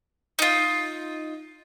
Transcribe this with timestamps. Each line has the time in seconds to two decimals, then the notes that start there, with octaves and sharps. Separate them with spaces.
0.39 D#4 F4